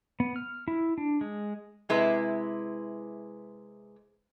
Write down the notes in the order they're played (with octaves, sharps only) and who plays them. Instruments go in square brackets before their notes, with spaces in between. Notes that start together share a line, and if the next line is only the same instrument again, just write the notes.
[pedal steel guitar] B3
F6
E4
D4
G#3
[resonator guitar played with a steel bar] C3 G#3 E4 B4